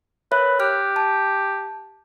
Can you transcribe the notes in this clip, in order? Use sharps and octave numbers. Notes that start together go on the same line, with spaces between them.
A#4 B4 C#5 E5
G4 F6 F#6
A5